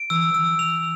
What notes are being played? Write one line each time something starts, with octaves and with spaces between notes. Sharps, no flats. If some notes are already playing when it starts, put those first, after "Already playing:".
Already playing: D7
E3 E6
E3 E6
F7